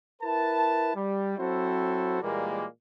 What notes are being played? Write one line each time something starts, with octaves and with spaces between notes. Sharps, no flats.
E4 A#4 B4 A5
G3
F#3 C4 E4 F#4 A4 C5
A#2 E3 G3 G#3 A#3